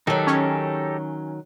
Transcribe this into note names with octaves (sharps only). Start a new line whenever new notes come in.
D#3 F#3 D#4 G4 A4
C#4